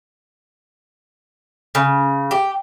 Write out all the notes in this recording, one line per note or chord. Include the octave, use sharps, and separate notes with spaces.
C#3
G4